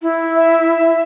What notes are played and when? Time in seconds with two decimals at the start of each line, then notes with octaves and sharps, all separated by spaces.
0.02 E4
0.35 E5